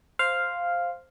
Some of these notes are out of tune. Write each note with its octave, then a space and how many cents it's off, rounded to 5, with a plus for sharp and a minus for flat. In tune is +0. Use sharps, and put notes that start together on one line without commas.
C5 +0 F5 +0